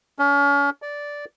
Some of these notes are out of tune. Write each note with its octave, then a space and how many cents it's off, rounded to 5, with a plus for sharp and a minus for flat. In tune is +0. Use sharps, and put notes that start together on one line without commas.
C#4 +35
D5 -10